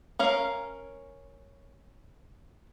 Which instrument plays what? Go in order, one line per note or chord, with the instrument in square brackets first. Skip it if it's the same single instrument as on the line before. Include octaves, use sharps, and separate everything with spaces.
[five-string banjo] C#4 A#4 F5